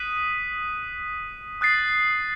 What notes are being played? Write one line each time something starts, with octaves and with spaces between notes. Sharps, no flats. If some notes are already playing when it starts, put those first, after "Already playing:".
Already playing: D#6 F#6 B6 D#7
D#6 F#6 A6 C7